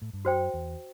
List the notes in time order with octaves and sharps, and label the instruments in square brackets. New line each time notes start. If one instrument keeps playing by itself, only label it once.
[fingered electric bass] A2
G2
[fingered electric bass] F#2 [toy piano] F#4 C5 G5
[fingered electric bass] E2